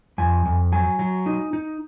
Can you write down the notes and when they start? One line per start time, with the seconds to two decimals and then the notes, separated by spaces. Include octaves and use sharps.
0.18 F2 G#5
0.45 F2
0.72 F#3 G#5
0.99 F#3
1.26 D#4
1.53 D#4